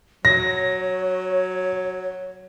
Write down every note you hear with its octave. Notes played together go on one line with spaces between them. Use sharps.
F#3 C#5 A#6